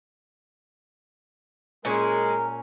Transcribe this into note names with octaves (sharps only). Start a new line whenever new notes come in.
A#2 G#3 C#4 A#4